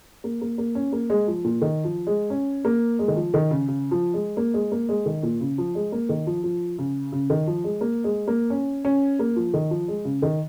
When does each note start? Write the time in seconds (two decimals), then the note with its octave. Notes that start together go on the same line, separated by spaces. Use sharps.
0.24 A#3
0.41 A#3
0.58 A#3
0.75 C#4
0.93 A#3
1.10 G#3
1.27 F3
1.44 A#2
1.62 D#3
1.84 F3
2.07 G#3
2.30 C#4
2.65 A#3
2.99 G#3
3.08 D#3
3.16 F3
3.34 D#3
3.51 C#3
3.68 C#3
3.91 F3
4.14 G#3
4.37 A#3
4.54 G#3
4.72 A#3
4.89 G#3
5.06 D#3
5.23 A#2
5.41 C#3
5.58 F3
5.75 G#3
5.92 A#3
6.09 D#3
6.27 F3
6.43 F3
6.78 C#3
7.12 C#3
7.30 D#3
7.47 F3
7.64 G#3
7.81 A#3
8.04 G#3
8.28 A#3
8.50 C#4
8.85 C#4
9.19 A#3
9.36 F3
9.54 D#3
9.71 F3
9.88 G#3
10.05 C#3
10.22 D#3